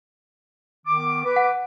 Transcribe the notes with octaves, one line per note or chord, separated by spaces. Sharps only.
D#3 B3 D6
B4 D6
F#5